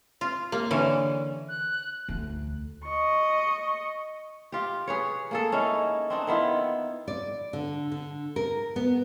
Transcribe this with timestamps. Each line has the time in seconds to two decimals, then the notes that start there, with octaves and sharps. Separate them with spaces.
0.21 F4
0.52 A#3
0.71 D3 E3 C#4
1.49 F#6
2.09 D2
2.85 D#5 C#6
4.52 F4 G4
4.87 G#4 B4 C#5
5.31 A#3 G#4 A4
5.52 C#4 D#4 E4
6.10 C4 D4 D#4
6.27 D#3 B3 E4 F4
7.08 D5
7.53 D3
7.92 D3
8.36 A#4
8.76 B3